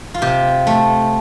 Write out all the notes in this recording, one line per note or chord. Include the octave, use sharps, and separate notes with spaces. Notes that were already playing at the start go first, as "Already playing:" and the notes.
F4
C3 G4
A3